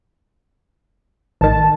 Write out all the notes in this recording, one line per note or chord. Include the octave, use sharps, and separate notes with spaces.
A1 D#3 A5